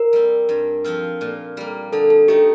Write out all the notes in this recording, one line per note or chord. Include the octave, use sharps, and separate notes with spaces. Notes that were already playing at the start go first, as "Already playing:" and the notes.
Already playing: A#4
G3 C4
G2
F3 C4 F4
A#2
G3 A#3
D3 A4
A4
A3 D#4 G4